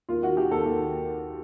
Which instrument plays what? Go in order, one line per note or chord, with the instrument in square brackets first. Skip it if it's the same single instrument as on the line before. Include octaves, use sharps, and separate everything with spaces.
[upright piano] D#2 F4
D#3 F#4
D#3 G4
D#2 A4
D#2
D#3